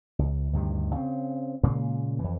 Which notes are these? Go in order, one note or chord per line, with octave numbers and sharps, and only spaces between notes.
C#2
D2 G2 C3 D#3
C#3 C4
A#2 C#3 G#3 A#3
F2 E3